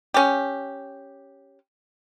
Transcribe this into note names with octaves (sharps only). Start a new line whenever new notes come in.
C#4 G4